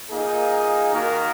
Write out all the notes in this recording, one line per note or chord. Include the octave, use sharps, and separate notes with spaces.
A#2 A#3 D#4 G#4
D#3 A#3 F#4 A#4